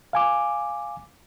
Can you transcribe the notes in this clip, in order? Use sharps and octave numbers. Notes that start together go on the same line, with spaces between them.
F5 G#5 D6